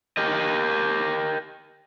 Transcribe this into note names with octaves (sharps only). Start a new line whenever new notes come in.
G4 A#4 D#5